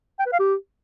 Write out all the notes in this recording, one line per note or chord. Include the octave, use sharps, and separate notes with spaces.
G5
B4
F5
G4